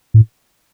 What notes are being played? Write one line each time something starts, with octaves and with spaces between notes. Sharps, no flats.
A2